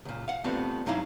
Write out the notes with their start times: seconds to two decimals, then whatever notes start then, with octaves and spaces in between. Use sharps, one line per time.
0.05 C#2 A#2
0.28 F5 F#5
0.44 A3 B3 C4 D4 F4 G4
0.86 G2 F#3 D#4 E4 F5